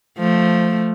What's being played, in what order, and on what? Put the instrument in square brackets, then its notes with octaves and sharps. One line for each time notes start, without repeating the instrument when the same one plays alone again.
[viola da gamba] F3 A3